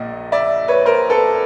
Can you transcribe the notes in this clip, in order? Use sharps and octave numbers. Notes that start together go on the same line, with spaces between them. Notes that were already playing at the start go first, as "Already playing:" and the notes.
Already playing: A#1 A#2 D#5
D5 E5
B4 C#5
A#4 C5
A4 B4